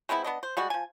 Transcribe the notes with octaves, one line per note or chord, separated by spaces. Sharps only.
G#3 B3 C4 E4
B3 D4 D#5
C5
G3 G#3 F#4
F3 G#5